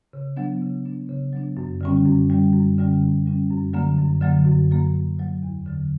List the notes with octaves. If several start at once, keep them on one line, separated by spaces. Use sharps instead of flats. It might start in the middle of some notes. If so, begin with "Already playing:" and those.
C#3
F#3 B3 D4
C#3
F#3 B3 D4
C#3
F#3 B3 D4
F#2
D3 G3 C#4
F#2
D3 G3 C#4
F#2
D3 G3 C#4
F#2
D3 G3 C#4
F#2
D3 F#3 A#3
F#2
D3 F#3 A#3
F#2
D3 F#3 A#3
F#2
D3 F#3 A#3
E2
D3 F#3